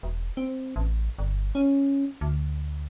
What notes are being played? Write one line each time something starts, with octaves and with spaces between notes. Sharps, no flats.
E1
C4
A1
G1
C#4
D2